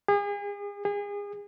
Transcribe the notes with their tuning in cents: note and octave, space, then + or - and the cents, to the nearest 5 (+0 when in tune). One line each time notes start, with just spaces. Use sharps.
G#4 -40
G#4 -35